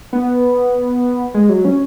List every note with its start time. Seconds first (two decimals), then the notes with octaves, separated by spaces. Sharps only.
0.13 B3
1.34 G#3
1.49 F#3
1.65 C#4